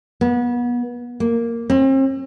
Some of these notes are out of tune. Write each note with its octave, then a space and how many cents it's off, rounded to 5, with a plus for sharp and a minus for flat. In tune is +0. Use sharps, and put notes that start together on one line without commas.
B3 -30
A#3 -5
C4 +40